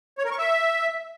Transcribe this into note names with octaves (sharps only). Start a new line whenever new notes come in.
C#5
A#4
C#6
E5